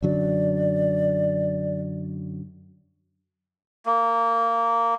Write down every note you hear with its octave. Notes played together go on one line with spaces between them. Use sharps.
F#2 D3 F#3 D5
A#3